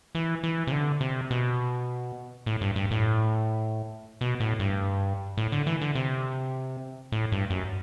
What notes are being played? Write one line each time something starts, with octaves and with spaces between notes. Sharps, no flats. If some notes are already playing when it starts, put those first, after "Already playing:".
E3
E3
C3
D3
C3
B2
A2
G2
G2
A2
B2
A2
G2
A2
D3
E3
D3
C3
A2
G2
F#2